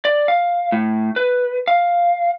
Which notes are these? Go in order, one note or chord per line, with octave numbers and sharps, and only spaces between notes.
D5
F5
A2
B4
F5